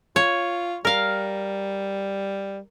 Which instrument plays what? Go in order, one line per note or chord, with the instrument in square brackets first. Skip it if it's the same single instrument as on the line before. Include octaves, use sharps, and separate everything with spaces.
[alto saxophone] F4 [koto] C#5
[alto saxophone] G3 [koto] A#4 F5